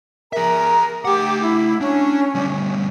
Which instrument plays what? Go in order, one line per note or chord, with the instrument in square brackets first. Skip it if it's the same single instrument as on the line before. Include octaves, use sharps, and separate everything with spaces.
[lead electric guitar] G#4 E5 [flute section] A#4 A#5
[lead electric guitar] A3 F#5 [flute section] G4 D6
[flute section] E4
[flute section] C#4 [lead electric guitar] D4
[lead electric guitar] D2 G3